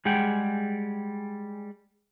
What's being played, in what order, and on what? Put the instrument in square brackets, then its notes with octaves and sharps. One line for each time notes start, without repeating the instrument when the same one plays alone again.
[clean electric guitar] G3 G#3 G#4 F#5 G5